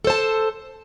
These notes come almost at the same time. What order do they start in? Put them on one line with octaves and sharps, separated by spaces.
A4 C5 A5